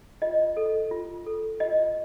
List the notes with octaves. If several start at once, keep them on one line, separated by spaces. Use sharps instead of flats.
F4 D#5
A4
F4
A4
F4 D#5